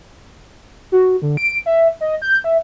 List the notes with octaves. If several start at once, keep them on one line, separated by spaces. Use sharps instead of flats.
F#4
D3
D7
E5
D#5
G6
E5